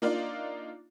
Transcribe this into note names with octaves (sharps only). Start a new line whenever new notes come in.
A#3 D4 D#4 F4 D5 F5